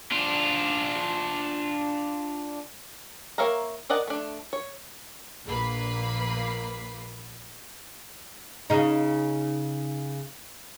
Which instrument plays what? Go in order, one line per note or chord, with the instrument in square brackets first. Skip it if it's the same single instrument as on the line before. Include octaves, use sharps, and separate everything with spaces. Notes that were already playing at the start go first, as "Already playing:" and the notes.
[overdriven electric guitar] D4 F4
[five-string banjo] A#3 C#5 E5 F5 A#5
A#4 D5 D#5 F#5 A5
A3 D4
C#5
[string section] A#1 A#3 B4 B5 C7
[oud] C#3 D#4